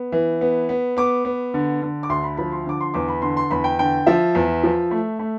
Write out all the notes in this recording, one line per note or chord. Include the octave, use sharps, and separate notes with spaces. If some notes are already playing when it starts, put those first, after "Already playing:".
Already playing: B3
E3
B3
B3
B3 D6
B3
D3
D3
D6
D2 C6
B5
F3 B5
C6
D3 D6
C6
E2 D6
B5
D3 C6
C6
E2 B5
G5
D3 G5
F3 E5
E2
F3
A3
A3